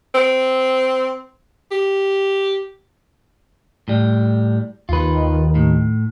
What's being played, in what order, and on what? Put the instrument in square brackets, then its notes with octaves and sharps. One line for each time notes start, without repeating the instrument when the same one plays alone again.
[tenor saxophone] C4
G4
[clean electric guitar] A2 G3
[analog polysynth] D#2 D#3 [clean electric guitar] F4 B4
[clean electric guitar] A2